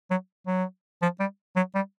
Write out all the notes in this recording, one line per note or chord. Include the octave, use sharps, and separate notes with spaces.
F#3
F#3
F3
G3
F#3
G3